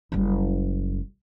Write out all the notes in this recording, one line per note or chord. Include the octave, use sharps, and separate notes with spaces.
F#1 G3